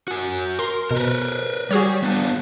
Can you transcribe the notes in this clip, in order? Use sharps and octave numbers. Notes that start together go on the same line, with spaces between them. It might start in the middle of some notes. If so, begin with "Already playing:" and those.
F#4 G#5
A#4 C6
B2 A#4 B4
G3 F#4 G#4 C#5
B3 D4 F4